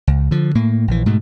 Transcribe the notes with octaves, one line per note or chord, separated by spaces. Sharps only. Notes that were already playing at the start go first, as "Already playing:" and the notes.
C#2
D3 F3
A2 A#3
A#1 E3
G#2 B2 A3